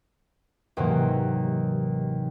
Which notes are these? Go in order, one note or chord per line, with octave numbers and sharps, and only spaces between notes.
D#2 G#2 C3 E3 F#3